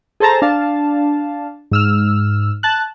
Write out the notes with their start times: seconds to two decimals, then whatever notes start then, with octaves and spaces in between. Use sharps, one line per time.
0.20 G#4 A4 C5 A5 A#5
0.42 D4 F5 A5
1.71 G#2 E6 F6
2.63 A5 F#6